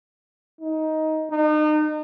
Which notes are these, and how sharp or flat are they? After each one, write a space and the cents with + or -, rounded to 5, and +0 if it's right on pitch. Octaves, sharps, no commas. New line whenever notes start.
D#4 +15
D#4 -35